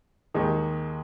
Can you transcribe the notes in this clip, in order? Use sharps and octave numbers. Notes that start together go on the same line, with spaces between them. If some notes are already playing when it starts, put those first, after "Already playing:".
D#2 D#3 G#3